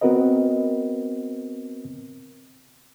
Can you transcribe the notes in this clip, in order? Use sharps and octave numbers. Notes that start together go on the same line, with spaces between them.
B3 C4 F#4 A#4 B4 D#5